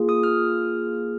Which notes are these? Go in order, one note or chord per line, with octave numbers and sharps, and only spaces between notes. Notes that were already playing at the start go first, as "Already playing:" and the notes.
Already playing: A#3 F4 G#4
D#6
F6